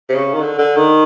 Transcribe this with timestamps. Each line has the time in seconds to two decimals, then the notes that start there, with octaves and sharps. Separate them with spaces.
0.09 C3
0.15 C#3
0.34 D#3
0.41 D3
0.58 D3
0.76 D#3